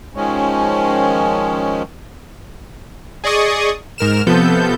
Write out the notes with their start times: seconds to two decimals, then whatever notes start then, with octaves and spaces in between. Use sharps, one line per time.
0.15 D#3 F3 G#3 C#4
3.24 G#4 D5 D#5 C#6 D#6
3.98 G#2 A#4 F6 E7
4.27 C3 F3 B3 A4 G6